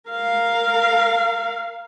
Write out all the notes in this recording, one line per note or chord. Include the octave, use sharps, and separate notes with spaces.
A#4 F5